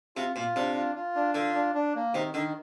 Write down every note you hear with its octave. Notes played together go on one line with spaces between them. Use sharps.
C3 F4
A#2 F4
C3 D4
F4
F4
D4
D3 F4
D4
D4
A#3
C3 D#3
D3 D#3